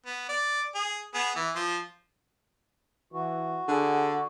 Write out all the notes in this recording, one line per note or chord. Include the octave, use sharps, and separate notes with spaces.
B3
D5
G#4
B3 G#4
E3
F3 C6
E3 F#4
D3 G#4